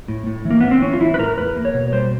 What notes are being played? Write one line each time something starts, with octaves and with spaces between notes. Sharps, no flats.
A2
A2
E3
A#3
A2 B3
C4
E3 C#4
F4
E3 E4
B4
A2 A#4
E2 B4
A#3
C#5
B2
G3 C5